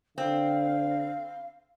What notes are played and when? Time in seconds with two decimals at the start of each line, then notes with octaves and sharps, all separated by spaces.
0.18 D3 C4 F5